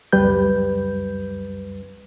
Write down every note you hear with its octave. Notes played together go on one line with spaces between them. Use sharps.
C#2 F#2 G3 B4 G6